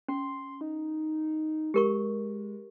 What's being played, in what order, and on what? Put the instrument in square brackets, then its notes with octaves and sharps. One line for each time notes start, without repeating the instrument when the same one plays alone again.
[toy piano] C#4 [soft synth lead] C6
[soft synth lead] D#4
[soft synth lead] G#3 [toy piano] G4 A#4 C#6